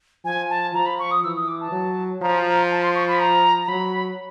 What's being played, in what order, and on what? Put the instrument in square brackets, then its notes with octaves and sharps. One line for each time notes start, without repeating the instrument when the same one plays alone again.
[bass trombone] F3 [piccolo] G#5
[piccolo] A5
[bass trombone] F3 [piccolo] A#5
[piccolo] B5
C#6
D#6
[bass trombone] E3 [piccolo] E6
[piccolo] D#6
D6
A5
[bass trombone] F#3
[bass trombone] F3 [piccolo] A#5
[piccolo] A#5
A5
C6
C#6
B5
A#5
A#5
[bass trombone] F#3 [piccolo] B5